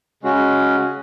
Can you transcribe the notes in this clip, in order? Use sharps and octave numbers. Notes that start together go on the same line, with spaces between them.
C#3 G#3 C#4 F#4